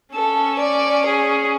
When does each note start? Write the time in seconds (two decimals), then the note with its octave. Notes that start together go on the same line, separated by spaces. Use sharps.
0.14 C#4 A4
0.60 D5
1.06 G#4